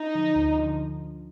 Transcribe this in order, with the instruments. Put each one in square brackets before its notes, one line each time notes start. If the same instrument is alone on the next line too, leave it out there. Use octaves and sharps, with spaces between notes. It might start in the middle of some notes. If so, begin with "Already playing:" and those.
Already playing: [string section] D#4
[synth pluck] D3 F3
D2
D3 F3